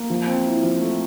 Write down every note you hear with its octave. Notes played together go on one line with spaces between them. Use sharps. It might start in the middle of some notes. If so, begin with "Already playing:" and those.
Already playing: A#3
F3
C4
E4
F3
A3